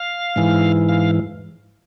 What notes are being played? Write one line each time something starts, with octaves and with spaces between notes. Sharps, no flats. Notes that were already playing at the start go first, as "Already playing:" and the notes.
Already playing: F5
G#2 E3
F5